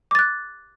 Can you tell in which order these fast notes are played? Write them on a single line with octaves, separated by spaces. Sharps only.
D6 A6 F#6